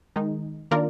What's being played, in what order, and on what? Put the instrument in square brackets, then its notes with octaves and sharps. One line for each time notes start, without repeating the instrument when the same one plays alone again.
[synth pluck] D#3 G#3 D#4
D#3 A#3 D4 F4 A#4 D5